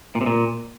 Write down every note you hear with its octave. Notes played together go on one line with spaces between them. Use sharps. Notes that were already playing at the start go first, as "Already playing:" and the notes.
A#2
C3
A#2